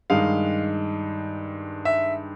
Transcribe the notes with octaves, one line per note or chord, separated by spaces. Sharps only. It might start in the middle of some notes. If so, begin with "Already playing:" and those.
G2 D#3 G#3 F5
E5